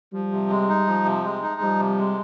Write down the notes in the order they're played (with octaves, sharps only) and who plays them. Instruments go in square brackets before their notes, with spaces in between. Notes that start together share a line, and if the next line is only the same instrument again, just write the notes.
[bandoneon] F3 [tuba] G3
[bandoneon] C3
G#3
D#4
F3
C3
G#3
D#4
[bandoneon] F3 [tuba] G3
[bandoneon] C3
G#3